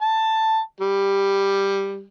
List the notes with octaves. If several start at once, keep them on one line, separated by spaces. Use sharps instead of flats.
A5
G3